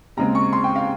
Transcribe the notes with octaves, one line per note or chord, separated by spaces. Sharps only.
D#2 C#3 G#3 C4 A#5
C#6
C6
G5
F5